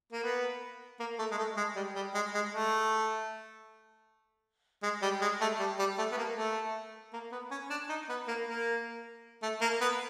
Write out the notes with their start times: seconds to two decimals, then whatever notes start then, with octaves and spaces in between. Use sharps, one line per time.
0.12 A#3
0.24 B3
1.00 A#3
1.19 A3
1.31 G#3
1.38 A3
1.57 G#3
1.76 G3
1.96 G3
2.15 G#3
2.34 G#3
2.53 A3
4.83 G#3
5.02 G3
5.21 G#3
5.41 A3
5.59 G3
5.79 G3
5.98 A3
6.12 B3
6.17 A#3
6.36 A3
7.13 A#3
7.32 B3
7.51 C#4
7.70 D4
7.89 D#4
8.09 B3
8.28 A#3
8.47 A#3
9.42 A3
9.61 A#3
9.81 B3